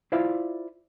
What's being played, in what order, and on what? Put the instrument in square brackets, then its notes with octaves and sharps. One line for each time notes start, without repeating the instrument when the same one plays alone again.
[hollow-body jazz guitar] E4 F4 C5 D5 E5 F5